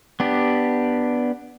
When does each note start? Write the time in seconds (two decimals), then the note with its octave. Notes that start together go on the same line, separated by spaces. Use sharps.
0.20 B3 D4 G4